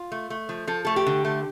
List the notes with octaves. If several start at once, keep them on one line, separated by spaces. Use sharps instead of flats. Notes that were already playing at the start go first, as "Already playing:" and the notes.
Already playing: F4
A3
A3
F3
F3 A4
A3 A4
G4
D3
A3